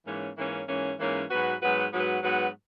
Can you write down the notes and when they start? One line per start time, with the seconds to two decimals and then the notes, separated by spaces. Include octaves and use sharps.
0.05 G#2 E3 A#3 C#4
0.37 G#2 E3 A#3 C#4
0.68 G#2 E3 A#3 C#4
0.98 G#2 E3 A#3 C#4
1.30 G#2 F#3 B3 F#4 B4
1.61 G#2 F#3 B3 F#4 B4
1.93 G#2 F#3 B3 F#4 B4
2.22 G#2 F#3 B3 F#4 B4